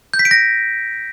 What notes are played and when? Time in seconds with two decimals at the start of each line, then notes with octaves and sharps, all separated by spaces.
0.14 G6
0.19 B6
0.25 D7
0.31 A#6